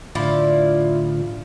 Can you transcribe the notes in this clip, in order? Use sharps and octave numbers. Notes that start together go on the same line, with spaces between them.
A2 D3 F3 E4 F4 D5